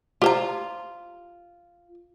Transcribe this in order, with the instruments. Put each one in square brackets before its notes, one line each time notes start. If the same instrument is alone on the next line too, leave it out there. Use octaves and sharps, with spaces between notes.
[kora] F4 [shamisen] G4 C5 A#5